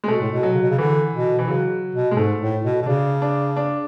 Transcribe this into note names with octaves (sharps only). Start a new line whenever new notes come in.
G#3
B2 A3
A2
B2
F#3
C#3
B2
C#3
D3 E3
B2
E3
C#3 F#3
B2
G#3
G#2 A3
A2
B2
B2
C#3 D4
D4
D4